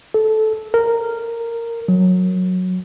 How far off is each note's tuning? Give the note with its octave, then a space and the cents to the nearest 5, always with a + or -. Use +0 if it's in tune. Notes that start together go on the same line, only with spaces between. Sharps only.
A4 -15
A#4 -10
F#3 -10